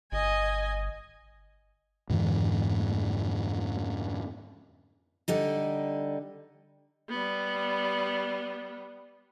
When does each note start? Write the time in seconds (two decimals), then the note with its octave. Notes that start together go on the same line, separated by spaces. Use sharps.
0.12 G1 D#5 G#5
2.10 F2 G#2 D3 E3
5.28 D3 G3 D#4
7.09 G3 B3